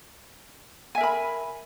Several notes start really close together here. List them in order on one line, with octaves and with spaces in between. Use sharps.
G#5 E5 A#4 B5